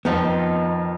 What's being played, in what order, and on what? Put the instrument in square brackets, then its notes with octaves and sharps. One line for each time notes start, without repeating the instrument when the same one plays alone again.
[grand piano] F2 [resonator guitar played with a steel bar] D#3 F3 D#4 [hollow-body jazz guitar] B3